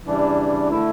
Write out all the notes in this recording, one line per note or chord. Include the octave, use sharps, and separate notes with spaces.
C#3 E3 G3 D4
D3 A3 E4